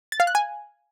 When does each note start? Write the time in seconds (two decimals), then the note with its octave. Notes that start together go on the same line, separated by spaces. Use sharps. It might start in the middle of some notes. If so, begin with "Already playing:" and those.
0.12 A6
0.20 F5
0.27 F#6
0.35 G#5